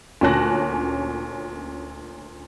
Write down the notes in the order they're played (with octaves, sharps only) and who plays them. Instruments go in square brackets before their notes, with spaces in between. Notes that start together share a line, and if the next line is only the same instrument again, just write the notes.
[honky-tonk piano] D2 A#2 C#4 A5 F#6 A#6